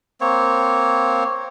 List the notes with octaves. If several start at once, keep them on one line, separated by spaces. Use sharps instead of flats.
A#3 C4 C#5